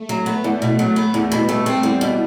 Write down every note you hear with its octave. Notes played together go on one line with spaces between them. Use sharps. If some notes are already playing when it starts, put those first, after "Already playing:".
Already playing: A3
F#3
B3
E2
B2
F#3
B3
E2
B2 G3
A3
C4
E2
B2